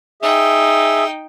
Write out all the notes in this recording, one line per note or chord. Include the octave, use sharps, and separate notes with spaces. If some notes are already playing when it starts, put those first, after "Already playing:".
D#4 G#4 E5 G5